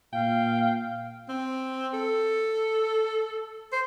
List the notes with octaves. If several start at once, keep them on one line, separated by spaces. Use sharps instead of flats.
A#2 F5 G5
C4
A4
C5